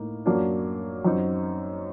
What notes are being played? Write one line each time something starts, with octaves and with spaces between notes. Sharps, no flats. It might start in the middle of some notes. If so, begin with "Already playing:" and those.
Already playing: A2 A#3 D#4
F#2 F#3 A#3 D4
F#2 F#3 C4 D#4